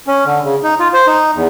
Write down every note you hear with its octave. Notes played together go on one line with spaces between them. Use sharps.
C#4
D3
C#3
D#4
F4
C5
D#4
E2